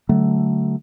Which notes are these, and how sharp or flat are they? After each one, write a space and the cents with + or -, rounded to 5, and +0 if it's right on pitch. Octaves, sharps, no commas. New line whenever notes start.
D3 +0 F#3 +25 A3 +0